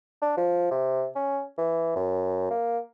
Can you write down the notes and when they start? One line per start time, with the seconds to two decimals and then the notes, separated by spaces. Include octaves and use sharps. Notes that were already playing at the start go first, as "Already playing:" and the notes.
0.22 D4
0.37 F3
0.71 C3
1.15 C#4
1.58 E3
1.96 F#2
2.50 A#3